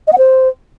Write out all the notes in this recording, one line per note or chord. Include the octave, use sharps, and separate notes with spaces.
D#5
F#5
C5